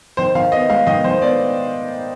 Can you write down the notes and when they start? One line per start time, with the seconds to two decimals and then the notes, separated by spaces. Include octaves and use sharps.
0.17 D#3 C5
0.35 D#3 F5
0.52 B3 D#5
0.69 G#3 F5
0.87 D#3 D#5
1.04 D#3 C5
1.22 B3 D5